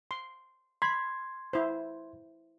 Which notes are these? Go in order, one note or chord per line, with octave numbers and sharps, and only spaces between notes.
C6
B5 C6 G#6
E4 C5